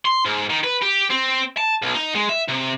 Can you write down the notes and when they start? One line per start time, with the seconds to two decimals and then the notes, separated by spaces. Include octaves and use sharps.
0.05 C6
0.25 G#2
0.50 D#3
0.64 B4
0.82 G4
1.11 C4
1.57 A5
1.82 B1
1.95 D#4
2.15 G#3
2.29 E5
2.49 C3